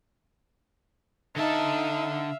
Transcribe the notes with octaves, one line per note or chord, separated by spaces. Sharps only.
D3 D#4 E5 F5 A5